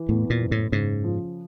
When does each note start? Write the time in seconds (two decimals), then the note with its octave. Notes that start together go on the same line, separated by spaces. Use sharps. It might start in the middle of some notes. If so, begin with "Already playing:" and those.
Already playing: E3
0.09 E2 A2
0.30 A#2
0.40 F#1
0.51 A2
0.72 G#2 C#3
1.04 F3